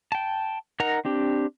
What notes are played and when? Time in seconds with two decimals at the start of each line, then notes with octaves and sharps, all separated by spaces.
0.12 G5 A5
0.80 D#4 A#4 F#5 A#5
1.05 C4 D4 G4